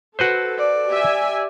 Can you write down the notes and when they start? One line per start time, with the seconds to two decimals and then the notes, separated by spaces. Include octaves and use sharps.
0.19 F#4 A4 B4 C5
0.58 D5
0.90 G4 E5 G#5